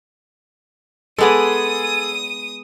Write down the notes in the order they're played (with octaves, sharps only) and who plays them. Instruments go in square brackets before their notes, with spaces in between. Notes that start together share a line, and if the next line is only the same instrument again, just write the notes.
[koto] G#3 B3 D5 [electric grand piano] G#4 A4 [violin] D#6 D#7